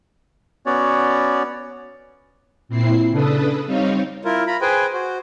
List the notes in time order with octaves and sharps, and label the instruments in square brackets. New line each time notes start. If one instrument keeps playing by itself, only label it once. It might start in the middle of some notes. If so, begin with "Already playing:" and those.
[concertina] B3 C#4 F#4 C#5 D5
[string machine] A#2 C4 E4 C7
C#3 D4 A4 B4 D#6
G3 C4 D#4 C#5 F5
[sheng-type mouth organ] E4 F4 A#4
F4 A#5 B5
G#4 B4 C5 G5 G#5
F#4 C5